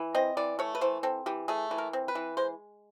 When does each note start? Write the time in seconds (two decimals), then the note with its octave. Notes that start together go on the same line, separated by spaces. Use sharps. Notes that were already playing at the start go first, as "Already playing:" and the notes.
Already playing: E3
0.15 C4 D#5
0.37 E3 D5
0.59 A3 C#5
0.75 B4
0.81 E3 C5
1.03 C4 A4
1.26 E3 G4
1.48 A3 G#4
1.71 E3
1.78 A#4
1.93 C4
2.08 B4
2.15 E3
2.37 G#3 C5